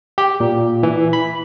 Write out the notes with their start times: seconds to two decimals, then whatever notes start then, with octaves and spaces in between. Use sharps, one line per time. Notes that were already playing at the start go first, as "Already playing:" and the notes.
0.18 G4
0.40 A#2
0.83 E3
1.13 B5